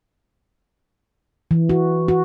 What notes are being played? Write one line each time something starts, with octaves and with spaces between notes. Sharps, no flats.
E3
F#4
F#4